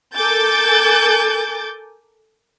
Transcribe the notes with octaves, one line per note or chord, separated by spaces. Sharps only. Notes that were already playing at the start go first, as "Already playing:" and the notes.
A4 A#4 G#5 D6 G6 A6